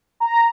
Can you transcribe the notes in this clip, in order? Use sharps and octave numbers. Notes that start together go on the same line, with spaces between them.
A#5